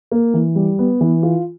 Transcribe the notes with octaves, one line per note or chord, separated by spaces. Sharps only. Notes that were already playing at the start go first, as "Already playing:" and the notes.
A#3
E3
G3
B3
E3
F4